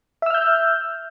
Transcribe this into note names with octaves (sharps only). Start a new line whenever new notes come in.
E5 E6 F6 G6